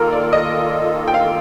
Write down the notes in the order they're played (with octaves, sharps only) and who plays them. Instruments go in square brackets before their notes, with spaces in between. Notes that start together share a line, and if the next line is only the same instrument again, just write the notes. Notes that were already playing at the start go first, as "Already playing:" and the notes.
Already playing: [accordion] D#3 A#3 F4 A4 [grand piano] A#4
[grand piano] D5
D#5
G5
F5